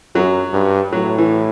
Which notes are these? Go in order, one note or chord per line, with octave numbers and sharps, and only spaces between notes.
F#2 F#3
G2
A2 F#3
E3